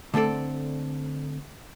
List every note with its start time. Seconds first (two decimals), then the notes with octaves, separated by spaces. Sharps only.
0.14 D3 A3 C4 A4 D5